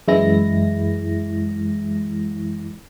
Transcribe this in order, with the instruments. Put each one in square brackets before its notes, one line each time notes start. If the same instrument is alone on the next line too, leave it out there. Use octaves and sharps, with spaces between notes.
[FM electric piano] F#2 E3 G#3 E4 A#6